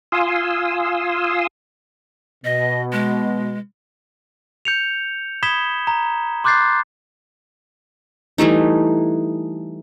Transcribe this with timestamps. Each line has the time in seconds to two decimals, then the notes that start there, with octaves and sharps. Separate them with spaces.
0.12 F4 F5 G#5 C6 D#6 E6
2.45 B2 D#5
2.92 G#3
4.65 G6 C#7 F7
5.43 B5 D#6 G#6 B6 E7 G7
5.87 A#5
6.44 C6 D6 F#6 G6 A6 C7
8.38 E3 G3 A3 D#4